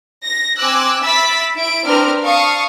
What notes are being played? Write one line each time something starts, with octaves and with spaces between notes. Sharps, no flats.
A#6
C4 G#5 D6 E6 F#6
E5 B5 E6 A6 B6 D7
E4 E5 D7
C4 D4 A#4 B4 F6
F5 A5 C#6 D#6